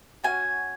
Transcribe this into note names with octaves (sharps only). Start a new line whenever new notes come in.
C#4 F#4 G#5